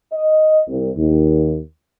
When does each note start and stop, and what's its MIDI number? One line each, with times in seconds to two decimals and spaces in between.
0.12 0.60 75
0.67 0.89 36
0.96 1.57 39